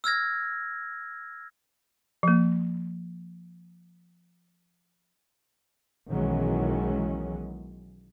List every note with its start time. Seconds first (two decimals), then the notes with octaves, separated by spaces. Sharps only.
0.04 E6 F6 G#6 A#6
2.23 F3 A#3
6.10 B1 D#3 E3 F#3 G#3 C#4